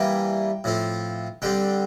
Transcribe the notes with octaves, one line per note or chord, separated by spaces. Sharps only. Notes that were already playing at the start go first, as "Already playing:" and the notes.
Already playing: E3 G3 A#3 G5
A2 F3 C4
D3 G3 C4 G5